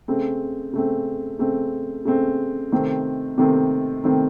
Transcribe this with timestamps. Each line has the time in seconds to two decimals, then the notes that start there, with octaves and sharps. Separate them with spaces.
0.08 C#3 A3 C4
0.73 C#3 A3 C4
1.39 C#3 A3 C4
2.05 C#3 A3 C4
2.72 C3 D#3 A3 C4
3.38 C3 D#3 A3 C4
4.04 C3 D#3 A3 C4